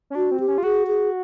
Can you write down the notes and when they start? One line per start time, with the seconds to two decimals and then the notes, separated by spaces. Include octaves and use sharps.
0.10 C#4
0.15 D4 F#4
0.31 C4
0.40 G4
0.48 C#4
0.58 F4
0.63 F#4 G#4
0.87 G#4